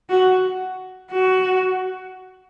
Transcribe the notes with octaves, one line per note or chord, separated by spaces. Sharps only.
F#4
F#4